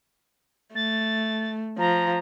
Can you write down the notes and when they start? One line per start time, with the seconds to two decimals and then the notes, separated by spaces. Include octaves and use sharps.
0.75 A3 A6
1.79 F3 A#5